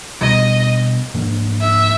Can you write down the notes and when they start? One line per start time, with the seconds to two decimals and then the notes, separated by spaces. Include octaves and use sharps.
0.21 B2 G3 B3 D4 D#5
1.14 G#2 F3 A#3 D4
1.61 E5